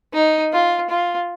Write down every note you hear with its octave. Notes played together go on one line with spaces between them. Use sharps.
D#4
F4
F4